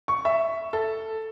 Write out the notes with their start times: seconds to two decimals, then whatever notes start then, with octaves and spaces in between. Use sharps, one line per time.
0.08 C#6
0.25 E5
0.73 A4